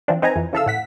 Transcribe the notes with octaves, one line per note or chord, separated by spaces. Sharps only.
E3 F3 C4 D4
C4 D#4 B4 G#5 A#5
F2 E3
C#3 E3 A4 E5 F5 E6
A2 F#5 B6